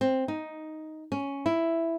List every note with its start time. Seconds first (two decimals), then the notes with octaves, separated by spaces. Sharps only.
0.01 C4
0.28 D#4
1.12 C#4
1.46 E4